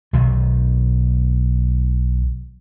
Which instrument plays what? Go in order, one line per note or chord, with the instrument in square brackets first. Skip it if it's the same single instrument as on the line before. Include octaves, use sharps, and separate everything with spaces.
[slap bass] B1 D#3